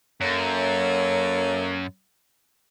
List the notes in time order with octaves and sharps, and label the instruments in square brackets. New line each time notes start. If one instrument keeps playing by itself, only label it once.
[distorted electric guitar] F#2 [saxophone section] A#3 A4 C#5